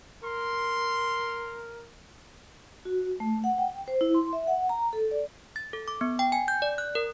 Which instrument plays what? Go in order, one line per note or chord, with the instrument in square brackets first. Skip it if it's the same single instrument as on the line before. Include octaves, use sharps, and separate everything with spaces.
[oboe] A#4 [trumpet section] C6
[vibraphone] F#4
A3
F#5
G5
C5
E4
C6
E5
F#5
A#5
A4
D5
[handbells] A6
A4
D6
B3
G5
G#5
G6
D5
F#6
A#4